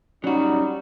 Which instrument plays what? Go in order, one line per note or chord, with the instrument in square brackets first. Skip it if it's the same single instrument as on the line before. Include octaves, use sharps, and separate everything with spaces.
[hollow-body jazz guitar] F#3 F#4 [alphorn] G3 [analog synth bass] C#4 [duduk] D#4